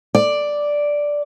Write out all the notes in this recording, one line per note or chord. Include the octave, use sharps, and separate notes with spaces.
D5